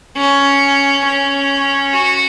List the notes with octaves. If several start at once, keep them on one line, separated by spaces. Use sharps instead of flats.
C#4
C#4
F#4